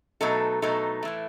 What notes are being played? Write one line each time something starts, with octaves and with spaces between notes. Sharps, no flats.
B2 F#3 A3 D#4 A4
B2 F#3 A3 D#4 A4
A2 E3 A3